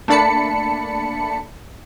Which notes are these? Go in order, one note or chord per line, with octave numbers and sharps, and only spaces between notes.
A3 A#3 D4 A5 B5 C#7